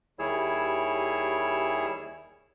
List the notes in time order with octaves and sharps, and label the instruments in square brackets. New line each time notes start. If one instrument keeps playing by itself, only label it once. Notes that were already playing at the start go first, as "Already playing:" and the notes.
[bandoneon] D#2 G3 E4 G#4 C#5 E6